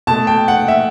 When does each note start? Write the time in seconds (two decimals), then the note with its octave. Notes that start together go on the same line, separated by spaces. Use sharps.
0.07 B2 A3 A5
0.27 G5
0.48 F#5
0.68 E5